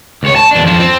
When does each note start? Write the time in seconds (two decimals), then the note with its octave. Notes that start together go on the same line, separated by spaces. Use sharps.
0.23 C#2 C#5
0.36 A5
0.51 E2 D4
0.64 F2 F3
0.80 C4